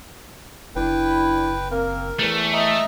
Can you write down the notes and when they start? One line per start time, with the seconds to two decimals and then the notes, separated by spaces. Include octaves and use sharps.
0.76 F#1 D4 E4 B4 G5
1.71 A#3 C4 A#4
2.19 E2 E3 A3
2.53 D#5 E5 A#5